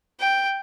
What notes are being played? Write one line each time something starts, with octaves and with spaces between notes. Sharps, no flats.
G5